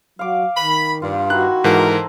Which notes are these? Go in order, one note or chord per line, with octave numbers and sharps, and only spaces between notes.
F#3 F5 D6
D#3 B5
G2 F4
D#3 E4 F#4 A#5 F#6
G#2 E3 A4 A#4 C5 A#5